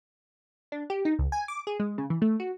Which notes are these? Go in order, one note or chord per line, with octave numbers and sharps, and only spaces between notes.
D4
G4
D#4
C#2
G#5
D6
G#4
G#3
C#3
E3
A3
F#4